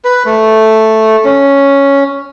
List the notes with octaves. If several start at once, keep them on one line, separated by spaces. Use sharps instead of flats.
B4
A3
C#4